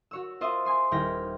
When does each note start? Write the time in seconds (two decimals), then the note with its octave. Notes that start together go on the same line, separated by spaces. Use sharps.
0.11 F#4 C#5 E6
0.41 F4 C5 D#5 E5
0.65 G#5 C6 D#6
0.91 D#1 E4 G5 F6 A#6